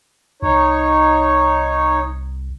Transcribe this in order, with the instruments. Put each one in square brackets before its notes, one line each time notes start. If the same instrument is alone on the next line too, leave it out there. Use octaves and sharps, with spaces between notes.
[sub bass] C2 [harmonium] D#4 C#5